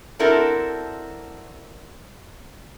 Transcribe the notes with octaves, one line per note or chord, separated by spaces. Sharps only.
C4 D4 E4 F#4 A4 A#4